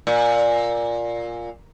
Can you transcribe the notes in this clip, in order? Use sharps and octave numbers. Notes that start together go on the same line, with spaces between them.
A#2